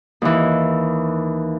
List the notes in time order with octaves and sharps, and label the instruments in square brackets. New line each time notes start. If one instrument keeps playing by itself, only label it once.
[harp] D#2 E3